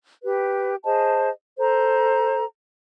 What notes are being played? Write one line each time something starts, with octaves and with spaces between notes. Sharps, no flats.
G4 B4
G#4 C5 D#5 A5
A4 C5 A#5